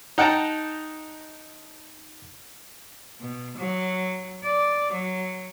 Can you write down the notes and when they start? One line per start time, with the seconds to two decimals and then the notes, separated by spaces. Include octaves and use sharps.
0.18 D#4 F#5 G5 A5 A#5
3.21 B2
3.58 F#3
4.43 D5
4.94 F#3